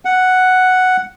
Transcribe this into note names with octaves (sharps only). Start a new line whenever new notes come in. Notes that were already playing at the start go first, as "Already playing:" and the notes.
F#5